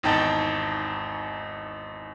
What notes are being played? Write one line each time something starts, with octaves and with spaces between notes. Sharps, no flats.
G#1 E2 D#4 G5 A5 A6